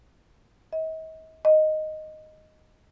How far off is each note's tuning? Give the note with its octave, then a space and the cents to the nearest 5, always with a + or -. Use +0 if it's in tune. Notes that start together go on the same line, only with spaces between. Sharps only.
D#5 +45
D#5 +0